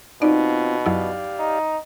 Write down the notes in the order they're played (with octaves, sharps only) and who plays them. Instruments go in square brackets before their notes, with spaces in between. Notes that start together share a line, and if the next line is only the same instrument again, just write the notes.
[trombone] B2 [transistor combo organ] C4 F4 [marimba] D#4 [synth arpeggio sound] D5
[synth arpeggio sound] F#2 F#3 E4 [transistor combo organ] G4 D5 F5
[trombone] D#4